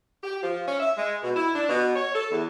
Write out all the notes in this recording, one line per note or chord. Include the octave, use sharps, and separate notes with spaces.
G4
F3
C#4
E5
G#3
B2
E4
D4
B2
C#5
A4
E2